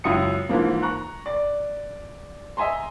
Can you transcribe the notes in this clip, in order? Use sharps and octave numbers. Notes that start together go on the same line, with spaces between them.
C#2 F#2 E4 D#6 C#7
G#2 E3 F3 A#3
A#5 C#6 F#6
D5
D#5 E5 G#5 A#5 C6